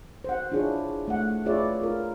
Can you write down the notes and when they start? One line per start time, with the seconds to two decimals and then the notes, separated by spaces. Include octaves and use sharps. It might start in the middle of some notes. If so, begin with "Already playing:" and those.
0.24 C5 F#5
0.52 D4 E4 F4 G#4 C#5
1.08 A3 F#5
1.45 F4 G#4 B4 C#5 D5 E5
1.81 F4 A#4